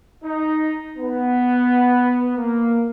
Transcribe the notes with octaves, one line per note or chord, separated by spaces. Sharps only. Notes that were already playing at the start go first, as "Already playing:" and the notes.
D#4
B3
A#3